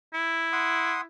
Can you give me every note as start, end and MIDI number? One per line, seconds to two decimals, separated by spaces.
0.14 1.04 64
0.53 1.01 78
0.53 1.01 84
0.53 1.01 87